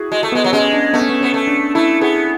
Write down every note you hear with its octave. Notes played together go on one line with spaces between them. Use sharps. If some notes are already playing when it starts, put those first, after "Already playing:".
Already playing: E4 F#4 G#4
G#3 F#4
A3
G#3 B3
F#3
G#3 C#4
D4
A3 B3
C#4
B3
B3 C#4
A3
D4
A3 E4
B3 G#4